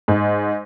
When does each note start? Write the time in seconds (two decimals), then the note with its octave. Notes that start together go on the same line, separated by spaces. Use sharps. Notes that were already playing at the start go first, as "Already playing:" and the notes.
0.08 G#2